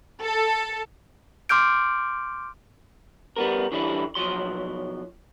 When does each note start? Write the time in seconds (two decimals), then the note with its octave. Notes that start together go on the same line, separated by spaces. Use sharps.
0.24 A4
1.49 C6 D6 F6 G6 D7
3.36 G3 B3 A#4
3.72 D3 E3 G3 E4
4.15 B1 F3 F#3 C6